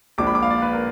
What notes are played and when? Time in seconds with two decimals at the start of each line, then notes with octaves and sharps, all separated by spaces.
0.18 A#1 A#2 G#3 D4 D6
0.27 B5
0.35 D6
0.42 F5
0.50 D5
0.62 B4
0.73 A#4